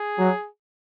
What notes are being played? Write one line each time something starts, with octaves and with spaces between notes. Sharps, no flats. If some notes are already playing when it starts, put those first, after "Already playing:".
Already playing: G#4
F#3